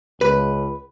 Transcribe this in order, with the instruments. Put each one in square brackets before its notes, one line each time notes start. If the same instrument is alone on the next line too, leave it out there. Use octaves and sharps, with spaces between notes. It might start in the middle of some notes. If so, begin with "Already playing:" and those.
[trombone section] C#2 [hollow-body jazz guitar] B4